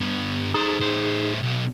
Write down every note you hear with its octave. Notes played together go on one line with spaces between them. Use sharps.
G2 B3
D#4 G#4 A4 C5
A2 C5
B1